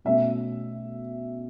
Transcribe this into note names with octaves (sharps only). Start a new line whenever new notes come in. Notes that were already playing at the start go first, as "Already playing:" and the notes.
B2 A3 C#4 E5